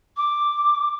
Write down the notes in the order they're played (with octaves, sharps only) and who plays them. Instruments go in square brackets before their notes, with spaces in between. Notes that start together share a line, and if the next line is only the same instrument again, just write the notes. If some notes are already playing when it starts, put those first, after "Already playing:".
[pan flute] D6